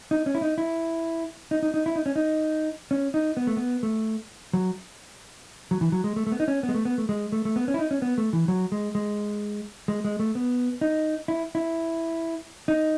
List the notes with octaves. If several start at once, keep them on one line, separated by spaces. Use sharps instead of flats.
D#4
C#4
E4
D#4
E4
D#4
D#4
D#4
E4
D#4
C#4
D#4
C#4
D#4
B3
A3
B3
A3
F#3
F#3
E3
F#3
G#3
A3
A3
B3
D#4
C#4
B3
G#3
A3
B3
A3
G#3
A3
A3
B3
C#4
E4
D#4
C#4
B3
A3
E3
F#3
G#3
G#3
G#3
G#3
A3
B3
D#4
E4
E4
D#4